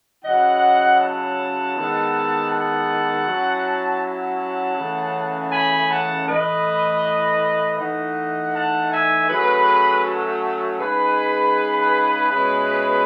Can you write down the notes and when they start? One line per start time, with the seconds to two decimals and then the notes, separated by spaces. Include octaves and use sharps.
0.25 C#3 F#3 C#4 E4 D#5 F#5
1.00 F#5 A5
1.76 D#3 G#3 B3 E4
2.50 F#5 A5
3.26 F#3 C#4 E4
4.01 F#5 A5
4.76 C#3 E3 A3 C#4
5.52 G#5 B5
5.90 F#5 A5
6.27 A2 E3 A3 E4 B4 D#5
7.78 E3 A3 D#4 D#5 F#5
8.53 F#5 A5
8.91 E5 G#5
9.29 F#3 A3 C#4 G#4 B4
10.04 F#4 A4
10.42 F#4 A4
10.80 C#3 G#3 D#4 G#4 B4
12.30 B2 G#3 C#4 E4